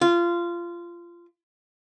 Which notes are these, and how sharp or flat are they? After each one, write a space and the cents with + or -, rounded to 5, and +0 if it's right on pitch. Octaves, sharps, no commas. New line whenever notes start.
F4 -20